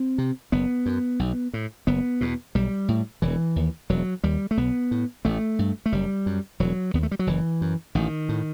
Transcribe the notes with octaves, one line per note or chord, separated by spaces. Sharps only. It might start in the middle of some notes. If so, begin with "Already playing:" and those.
Already playing: C4
C3
F#1 B3
F#2
B1
A2
F#1 B3
E2 B2
B1 G3
A2
E1 E3
D#2
E1 F#3
D#2 G3
A3
B1 B3
A2
A1 A3
G2
A3
F#1 G3
F#2
E1 F#3
D#2 B3
A3
G3
F#3
F#1 E3
F#2
A1 D#3
A2